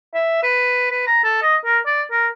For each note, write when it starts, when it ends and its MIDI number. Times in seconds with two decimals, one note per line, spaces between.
0.14 0.41 76
0.43 0.88 71
0.91 1.05 71
1.07 1.22 82
1.23 1.39 69
1.42 1.56 75
1.65 1.79 70
1.86 2.02 74
2.11 2.27 70